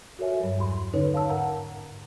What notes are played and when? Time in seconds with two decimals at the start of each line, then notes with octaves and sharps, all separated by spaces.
0.19 F#4 A4 A#4 C#5 E5 G#5
0.40 G2 F#3 G3
0.58 E2 G2 F#3 B5 C6
0.93 D3 C#4 D#4 A4 B4 C#5
1.14 F5 A5 E6
1.30 G#2 A#4 F#5 A#5